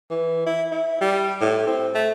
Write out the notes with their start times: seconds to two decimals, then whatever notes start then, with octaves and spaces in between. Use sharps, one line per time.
0.10 E3
0.46 E4
0.71 E4
1.01 G3
1.41 A2
1.67 C4
1.95 A3